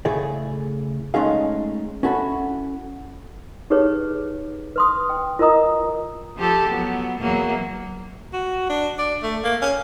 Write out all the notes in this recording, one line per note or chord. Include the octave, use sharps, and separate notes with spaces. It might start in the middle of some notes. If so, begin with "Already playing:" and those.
C#3 A3 E4 G#4 D5
G#3 A3 C#4 D#4 G#4 F5
C#4 E4 F#4 A4 A#5 B5
D#4 G4 G#4 B4 C#5
B4 C6 D#6
G5
F4 A#4 D#5 A#5 D#6
F3 G4 A4
F#3 B3
E2 F#3 A#3
F#4
D4
D5
A3
A#3
C#4